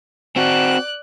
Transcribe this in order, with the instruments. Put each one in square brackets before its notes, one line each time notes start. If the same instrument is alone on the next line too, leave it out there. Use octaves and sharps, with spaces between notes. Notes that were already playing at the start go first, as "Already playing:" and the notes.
[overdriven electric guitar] C4 F#4 [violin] D5 F#6